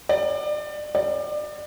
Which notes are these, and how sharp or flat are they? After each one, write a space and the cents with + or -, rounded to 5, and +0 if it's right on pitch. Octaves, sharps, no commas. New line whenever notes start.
D5 +30
D5 +30